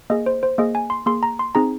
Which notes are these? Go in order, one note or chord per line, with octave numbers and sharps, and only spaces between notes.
A#3 G#4 D#5
C5
C5
A#3 G#4 D#5
G#5
C6
A#3 G#4 C6
A#5
C6
C4 D#4 G#4 A#5